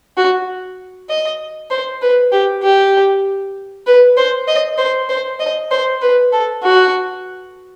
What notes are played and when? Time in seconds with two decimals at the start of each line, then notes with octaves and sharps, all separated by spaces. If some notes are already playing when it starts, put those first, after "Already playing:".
0.17 F#4
1.09 D#5
1.70 C5
2.02 B4
2.32 G4
2.63 G4
3.86 B4
4.17 C5
4.48 D#5
4.78 C5
5.09 C5
5.39 D#5
5.71 C5
6.02 B4
6.32 A4
6.63 F#4